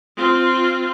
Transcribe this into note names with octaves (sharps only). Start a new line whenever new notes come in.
C4 F4